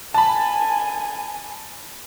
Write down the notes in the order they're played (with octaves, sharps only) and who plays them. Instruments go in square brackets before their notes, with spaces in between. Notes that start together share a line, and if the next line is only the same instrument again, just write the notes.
[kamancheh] G#5 [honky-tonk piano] A5 B5